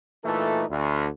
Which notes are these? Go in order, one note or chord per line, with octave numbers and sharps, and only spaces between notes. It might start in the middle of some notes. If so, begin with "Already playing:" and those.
A#2 E3 A3 D#4 A4
D2